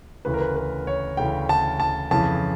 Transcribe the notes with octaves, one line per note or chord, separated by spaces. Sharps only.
D2 C#3 E3 B4
A#4
B4
B4
C#5
D2 C#3 E3 G5
A5
A5
F2 C#3 E3 A5